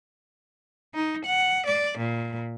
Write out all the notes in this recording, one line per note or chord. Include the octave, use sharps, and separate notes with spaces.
D#4
F#5
D5
A#2